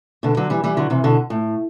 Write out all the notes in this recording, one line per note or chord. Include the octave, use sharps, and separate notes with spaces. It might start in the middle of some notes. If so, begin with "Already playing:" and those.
B2 D3
D3 F#3
E3 G3
E3 G3
D3 F#3
C3 E3
B2 D3
A2